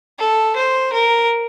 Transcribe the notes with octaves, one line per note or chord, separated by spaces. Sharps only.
A4
C5
A#4